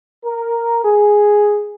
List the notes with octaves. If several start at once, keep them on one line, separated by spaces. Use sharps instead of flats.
A#4
G#4